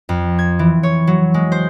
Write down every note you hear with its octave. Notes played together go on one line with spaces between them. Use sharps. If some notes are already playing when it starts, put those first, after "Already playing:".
F2
G#6
E3
C#5
F#3
G#3
C5